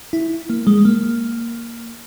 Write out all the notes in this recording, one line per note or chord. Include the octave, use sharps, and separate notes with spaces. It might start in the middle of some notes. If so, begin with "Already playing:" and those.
E4
A#3
G#3
A#3